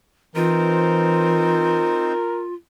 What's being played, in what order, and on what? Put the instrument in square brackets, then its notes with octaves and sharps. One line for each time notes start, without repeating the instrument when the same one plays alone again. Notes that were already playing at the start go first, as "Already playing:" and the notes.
[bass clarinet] E3 [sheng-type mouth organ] C4 D#4 C5 [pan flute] F4 [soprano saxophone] A#4